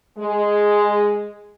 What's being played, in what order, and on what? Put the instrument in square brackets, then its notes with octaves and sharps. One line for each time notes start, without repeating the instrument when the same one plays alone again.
[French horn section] G#3